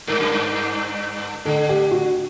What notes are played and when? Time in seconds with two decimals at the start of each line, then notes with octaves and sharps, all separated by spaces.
0.07 G2 A#4
0.20 F#2
0.32 G2
1.45 D3 A4
1.69 G4
1.91 F#4